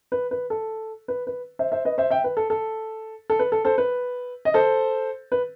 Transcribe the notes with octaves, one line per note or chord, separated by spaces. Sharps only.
B4
B4
A4
B4
B4
C5 E5
C5 E5
B4 D#5
C5 E5
E5 G5
B4
A4
A4
A4
B4
A4
A4 C5
B4
D#5
A4 C5
B4